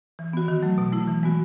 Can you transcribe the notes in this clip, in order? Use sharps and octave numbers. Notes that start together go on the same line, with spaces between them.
E3
B3 F#4
D#3
F#3 A3
B2
A3 E4
E3
G#3 B3 F#4